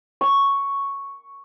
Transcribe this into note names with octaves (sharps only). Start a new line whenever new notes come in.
C#6